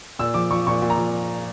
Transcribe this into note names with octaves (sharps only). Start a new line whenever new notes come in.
A#2 E6
F3 D6
F3 C#6
A#2 C#6
A#2
A#5
F3